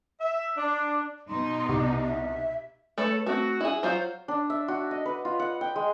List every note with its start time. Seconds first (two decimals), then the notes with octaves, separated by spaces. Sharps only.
0.21 E5
0.57 D4
1.29 B2 D#4 C6
1.69 C2 G4
2.03 E5
2.98 A3 A4 B4 C#5
3.26 A3 C4 F#4
3.61 E4 G#4
3.83 F#3 F4 F#4 C5
4.28 D4
4.50 E5
4.68 F#4
4.91 D#5
5.06 B4
5.25 F4
5.39 F#5
5.61 G5
5.76 G#3